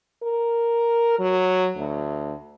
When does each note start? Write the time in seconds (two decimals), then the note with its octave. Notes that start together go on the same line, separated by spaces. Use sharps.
0.23 A#4
1.19 F#3
1.77 D2